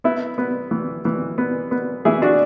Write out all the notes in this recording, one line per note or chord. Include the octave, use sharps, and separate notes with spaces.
B3 E4
B3
E3
E3
B3
B3
E3 E4 G#4
D4 F#4